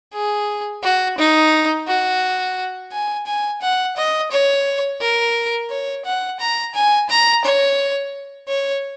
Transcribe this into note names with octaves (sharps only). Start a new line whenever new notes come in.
G#4
F#4
D#4
F#4
G#5
G#5
F#5
D#5
C#5
A#4
C#5
F#5
A#5
G#5
A#5
C#5
C#5